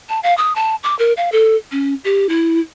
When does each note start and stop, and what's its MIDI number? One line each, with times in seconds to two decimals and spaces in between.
0.09 0.20 81
0.23 0.36 77
0.38 0.53 87
0.56 0.75 81
0.83 0.97 86
0.99 1.13 70
1.17 1.32 77
1.32 1.56 69
1.72 1.94 61
2.04 2.29 67
2.29 2.59 64